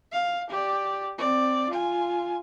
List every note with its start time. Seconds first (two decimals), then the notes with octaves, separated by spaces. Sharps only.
0.12 F5
0.50 G4 D5
1.18 C4 D5
1.69 F4 G#5